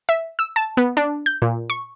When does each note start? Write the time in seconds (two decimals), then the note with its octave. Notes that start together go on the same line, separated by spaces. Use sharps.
0.09 E5
0.39 E6
0.56 A5
0.77 B3
0.97 D4
1.26 G6
1.42 A#2
1.70 C#6